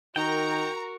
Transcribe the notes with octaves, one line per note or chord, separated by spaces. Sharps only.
D#3 F#4 A#4 G5 A#5